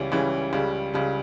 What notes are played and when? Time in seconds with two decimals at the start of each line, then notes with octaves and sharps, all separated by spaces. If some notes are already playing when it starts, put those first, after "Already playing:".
Already playing: C#2 C#3 E3 G3 C#4
0.12 C#2 C#3 E3 G3 C#4
0.53 C#2 C#3 G3
0.94 C#2 C#3 G3